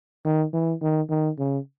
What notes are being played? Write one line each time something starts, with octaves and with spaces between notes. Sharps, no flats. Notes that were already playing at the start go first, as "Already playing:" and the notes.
D#3
E3
D#3
D#3
C#3